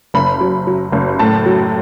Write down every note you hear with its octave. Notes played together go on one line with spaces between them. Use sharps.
F#1 B5
F#3
F#3
F#1
A2 A5
F#3